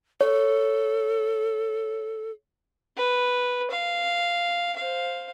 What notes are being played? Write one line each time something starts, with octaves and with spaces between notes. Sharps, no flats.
A4 C#5
B4
F5
C5 F5